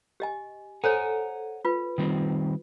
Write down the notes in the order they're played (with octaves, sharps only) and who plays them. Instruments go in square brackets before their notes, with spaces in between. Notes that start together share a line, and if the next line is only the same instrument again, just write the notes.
[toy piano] G4 D#5 G#5
[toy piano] A4 C5 C#5 [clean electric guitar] F#5 G#5 A#5
[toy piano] F4 B4
[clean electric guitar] D#3 G3 C4